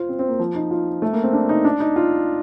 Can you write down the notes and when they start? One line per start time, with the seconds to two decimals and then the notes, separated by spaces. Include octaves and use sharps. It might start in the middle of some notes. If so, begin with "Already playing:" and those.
Already playing: F4 C5
0.09 C4
0.19 C4
0.29 A#3
0.39 F3
0.55 D#4
0.71 F4
1.02 A3
1.13 A#3
1.23 C4
1.33 D4
1.49 D#4
1.65 D4
1.80 D#4
1.96 F4